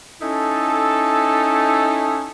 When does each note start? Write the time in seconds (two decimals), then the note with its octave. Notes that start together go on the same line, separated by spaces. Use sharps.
0.22 C#4 D#4 E4 A4